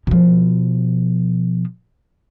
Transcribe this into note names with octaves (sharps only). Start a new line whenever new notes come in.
B2 F3